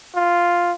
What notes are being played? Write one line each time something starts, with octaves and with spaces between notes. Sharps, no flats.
F4